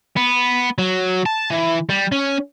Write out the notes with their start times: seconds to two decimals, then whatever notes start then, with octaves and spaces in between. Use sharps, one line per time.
0.17 B3
0.78 F#3
1.26 A5
1.50 E3
1.89 G3
2.12 C#4